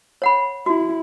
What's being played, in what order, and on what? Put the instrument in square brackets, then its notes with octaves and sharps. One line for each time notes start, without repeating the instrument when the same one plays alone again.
[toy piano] C#5 F#5 B5
[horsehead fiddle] E4 [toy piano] F#4